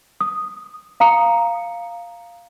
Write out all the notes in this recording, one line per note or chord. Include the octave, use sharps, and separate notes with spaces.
D#6
F5 A#5 D#6 C#7